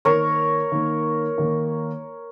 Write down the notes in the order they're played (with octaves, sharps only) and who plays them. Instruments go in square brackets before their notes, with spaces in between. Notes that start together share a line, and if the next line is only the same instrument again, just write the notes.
[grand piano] D#3 A#3 D#4 [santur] A#4 C#5
[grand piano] D#3 A#3 D#4
D#3 A#3 D#4